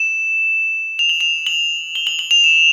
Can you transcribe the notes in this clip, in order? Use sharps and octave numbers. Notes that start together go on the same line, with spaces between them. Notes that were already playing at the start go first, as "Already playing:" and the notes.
Already playing: E7
F7
F#7
F7
F#7
G7
F#7
F#7
F7
E7